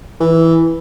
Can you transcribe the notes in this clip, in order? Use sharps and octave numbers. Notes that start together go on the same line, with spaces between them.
E3